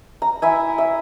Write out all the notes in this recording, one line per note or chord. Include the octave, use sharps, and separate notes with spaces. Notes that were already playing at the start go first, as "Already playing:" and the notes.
A#5
E4 E5 G#5
E5